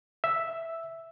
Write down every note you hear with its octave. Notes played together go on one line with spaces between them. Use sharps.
E5